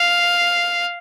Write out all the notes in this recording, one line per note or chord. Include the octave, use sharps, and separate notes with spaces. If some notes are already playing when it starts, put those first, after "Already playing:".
Already playing: F5